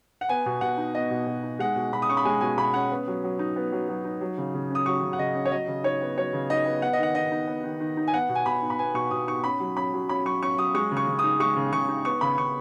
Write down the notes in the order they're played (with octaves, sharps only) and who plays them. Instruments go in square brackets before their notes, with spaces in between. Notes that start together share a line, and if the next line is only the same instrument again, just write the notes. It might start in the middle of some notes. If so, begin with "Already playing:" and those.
[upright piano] F#5
B3 G#5
B2
B2 F#5
D#4
B3 D#5
B2
B2
D#4
G#3 F#5
B2
B2 B5
D#6
C#4 C#6
B5
G#3 G#5
B2 G#5
B2 B5
C#4 F#5
B3
F#3
F#3
D#4
B3
F#3
F#3
D#4
F#3
C#3
C#3
C#4 D#6
F#3 C#6
C#3
F#5
C#3 D#5
C#4
C#5
F#3 D#5
C#3
D#4 C#5
B3
F#3 C#5
C#3
D#4 D#5
B3
B3 F#5
D#5
D#3 F#5
D#3 D#5
D#4
B3
D#3
D#3
D#4
G#5
B3 F#5
B2
G#5
B2 B5
D#4
B5
B3 G#5
B2 C#6
B2 D#6
D#4 C#6
C#4 B5
F#3
C#4 B5
F#3
C#4 B5
F#3 C#6
C#4 C#6
F#3 D#6
G#3 C#6
C#3
C#6
C#3
D#6
D#4
G#3 C#6
C#3
C#3 C#6
D#4
B3 C#6
C#3 B5
C#3 C#6